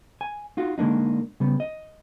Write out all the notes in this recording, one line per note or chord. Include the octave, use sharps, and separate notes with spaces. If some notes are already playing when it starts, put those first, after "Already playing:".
G#5
D#4 F4 F#4
D3 G#3 A#3 D4 D#4
C#3 G3 B3
D#5